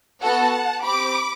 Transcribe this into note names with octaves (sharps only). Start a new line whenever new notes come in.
B3 F#4 A4 F#5 A5
C4 G4 B5 D6